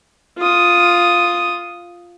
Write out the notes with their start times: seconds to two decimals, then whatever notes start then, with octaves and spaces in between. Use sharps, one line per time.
0.38 F4 D#6